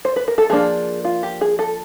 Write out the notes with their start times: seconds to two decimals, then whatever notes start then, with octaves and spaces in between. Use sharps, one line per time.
0.05 C5
0.16 B4
0.28 A#4
0.38 A4
0.50 F3 A#3 D4 G#4
1.05 F4
1.23 G4
1.41 G#4
1.59 A4